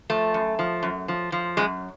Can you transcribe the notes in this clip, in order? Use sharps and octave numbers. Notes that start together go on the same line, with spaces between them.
F3 A3
F#2
F3
F#2
F3
F3
F#2 G#3